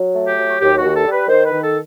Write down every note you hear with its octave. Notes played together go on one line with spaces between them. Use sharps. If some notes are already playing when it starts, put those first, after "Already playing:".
Already playing: F#3
A3
G4
F#3
F#4
D#2 G4
D#2 F#4
A4
G3
B4
D#3 C5
B4
D#3
A4